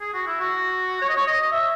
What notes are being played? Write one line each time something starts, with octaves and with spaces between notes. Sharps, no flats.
G#4
F#4
E4
F#4
C#5
D#5
C#5
D#5
E5